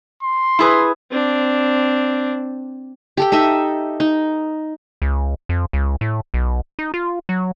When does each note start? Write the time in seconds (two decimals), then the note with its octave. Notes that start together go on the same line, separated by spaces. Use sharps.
0.23 C6
0.59 E4 G#4 B4
1.11 C4 D4
3.17 G4 A4 G5
3.32 D#4 A4 D#5 E5
4.00 D#4
5.02 C#2
5.49 F2
5.73 C#2
6.01 A2
6.34 B1
6.79 D#4
6.94 F4
7.29 F#3